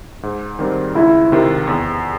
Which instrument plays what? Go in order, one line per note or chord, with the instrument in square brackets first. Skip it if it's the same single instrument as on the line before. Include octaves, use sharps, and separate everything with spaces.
[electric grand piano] G#2
D#3 G3 C4
[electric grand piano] C#2 [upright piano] E4
[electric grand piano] C3 D#3
E2